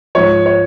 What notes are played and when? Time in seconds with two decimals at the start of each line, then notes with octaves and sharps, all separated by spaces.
0.15 G#2 F3 C#5
0.46 C#5